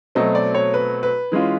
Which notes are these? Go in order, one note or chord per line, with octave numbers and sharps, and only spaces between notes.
B2 F#3 A3 C4 D#5
D5
C#5
B4
B4
E3 G#3 C#4 F4